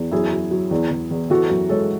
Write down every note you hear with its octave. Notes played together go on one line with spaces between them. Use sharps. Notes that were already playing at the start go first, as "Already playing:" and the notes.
Already playing: E2
F#2 E4 G#4
F#3
F#3
E2
E2
E2
E3 F#4 A4
F#2
G#3 A4 C#5